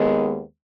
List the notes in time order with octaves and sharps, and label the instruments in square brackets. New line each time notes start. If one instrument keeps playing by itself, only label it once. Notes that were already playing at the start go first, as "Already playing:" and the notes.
Already playing: [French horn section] D#2 D#3 G#3 B3